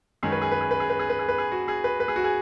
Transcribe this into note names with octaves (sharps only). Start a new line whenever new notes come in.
F#2 D#3 G#3 C#4 G#4
B4
G#4
B4
G#4
B4
G#4
B4
G#4
B4
G#4
B4
G#4
F#4
G#4
B4
B4
G#4
F#4
G#4